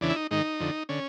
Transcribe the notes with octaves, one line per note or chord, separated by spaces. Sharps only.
E2 C#3 E3 D4
E4
D#4
G#2 D#3 D#4
F2 D3
D3 C#4